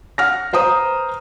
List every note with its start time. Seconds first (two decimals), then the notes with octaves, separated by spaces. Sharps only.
0.18 F#5 F6 A#6
0.53 B4 C5 A#5 D#6